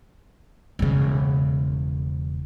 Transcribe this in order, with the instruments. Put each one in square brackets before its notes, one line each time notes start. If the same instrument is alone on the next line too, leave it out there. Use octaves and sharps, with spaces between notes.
[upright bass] E1 C#3